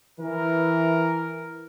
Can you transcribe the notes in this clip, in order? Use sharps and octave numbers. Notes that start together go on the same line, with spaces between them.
E3 A#4